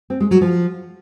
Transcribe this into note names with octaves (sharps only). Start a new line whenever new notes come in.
C4
G#3
F#3
F3